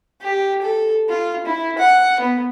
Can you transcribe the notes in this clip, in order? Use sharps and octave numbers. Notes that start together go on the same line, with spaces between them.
G4
A4
F4
E4
F#5
B3